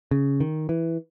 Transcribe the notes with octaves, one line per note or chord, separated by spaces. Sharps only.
C#3
D#3
E3